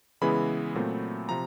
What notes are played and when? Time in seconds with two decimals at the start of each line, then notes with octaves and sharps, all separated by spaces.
0.21 C#3 E3 G#3 B3 E4 B5
0.75 A#2 F#3 A3 C4
1.29 C3 F3 A#5